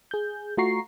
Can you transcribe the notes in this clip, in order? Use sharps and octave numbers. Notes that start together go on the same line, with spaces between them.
G#4 G6
A3 F4 F#4 A#5 C#6 C7